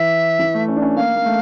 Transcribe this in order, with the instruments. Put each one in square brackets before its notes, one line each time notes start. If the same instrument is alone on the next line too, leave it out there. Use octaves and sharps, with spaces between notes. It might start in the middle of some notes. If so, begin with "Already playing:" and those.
Already playing: [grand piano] E3 [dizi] E5
[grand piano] E3
A3
C#4
D4
C#4
[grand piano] A#3 [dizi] F5
[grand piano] A#3
A3